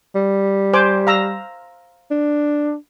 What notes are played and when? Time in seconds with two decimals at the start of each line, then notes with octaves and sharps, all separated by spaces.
0.15 G3
0.74 C5 G#5 D6
1.07 F5 A#5 E6
2.11 D4